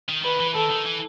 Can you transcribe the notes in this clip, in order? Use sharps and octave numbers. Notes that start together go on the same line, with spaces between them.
D#3
D#3 B4
E3
D#3 A4
D#3
E3